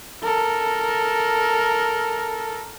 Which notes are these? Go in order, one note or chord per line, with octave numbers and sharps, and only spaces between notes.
A4 A#4